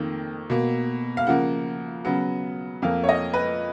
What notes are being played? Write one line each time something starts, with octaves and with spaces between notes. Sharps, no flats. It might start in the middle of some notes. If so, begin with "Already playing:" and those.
Already playing: F2 D#3 A#3
B2 A#3
F5
C#3 F3 A#3 F#5
C#3 F#3 B3
F2 F3 A#3 F5
C#5
D#5
B4